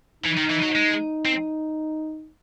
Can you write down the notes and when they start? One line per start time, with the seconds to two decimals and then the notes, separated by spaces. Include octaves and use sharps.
0.24 E3 D#4
0.37 D#3
0.50 E3
0.62 F#3
0.75 G#3
1.25 C4